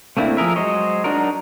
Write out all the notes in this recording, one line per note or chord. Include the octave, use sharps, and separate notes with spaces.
A3 A#3 C4 D4 E4
F3 G#4 A#4 E5
F#3 G#3 C5 C#5 D#5
F#3 D4 D#4 F#4 A#4